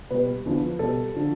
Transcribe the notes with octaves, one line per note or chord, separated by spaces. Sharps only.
B2 G3 B4
E2 D3 F3
B2 G3 A4
D3 F3